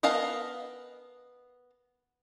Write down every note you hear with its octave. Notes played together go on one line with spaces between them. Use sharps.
B3 A#4 D#5 F5 A5